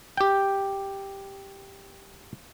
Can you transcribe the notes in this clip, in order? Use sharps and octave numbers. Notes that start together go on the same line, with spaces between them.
G4 G5